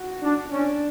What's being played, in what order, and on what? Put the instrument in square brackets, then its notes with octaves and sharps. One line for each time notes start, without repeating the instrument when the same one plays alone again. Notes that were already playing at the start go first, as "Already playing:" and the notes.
Already playing: [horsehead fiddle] F#4
[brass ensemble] D4
[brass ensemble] C#4 [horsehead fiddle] D4